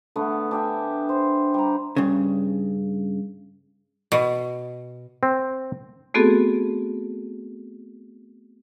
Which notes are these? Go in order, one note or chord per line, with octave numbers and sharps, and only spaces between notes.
D3 A3 B3
D4 G4 E5 G#5
C5
G3 A#5
G2 C#3
B2
C4
A3 B3 C4 F#4 G#4 A4